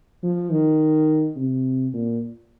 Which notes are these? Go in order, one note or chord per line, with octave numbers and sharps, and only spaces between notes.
F3
D#3
C3
A#2